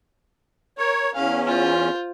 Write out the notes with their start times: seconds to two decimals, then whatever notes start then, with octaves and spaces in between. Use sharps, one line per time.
0.78 A#4 C#5
1.15 E2 C#4 F5
1.47 F4 C5